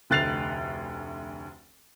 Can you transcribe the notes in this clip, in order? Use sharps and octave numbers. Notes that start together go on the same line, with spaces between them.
F1 D2 F#6 A6 C7 F7